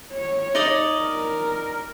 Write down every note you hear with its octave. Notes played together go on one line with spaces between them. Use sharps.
C#5
D#4 D5 D#5
A#4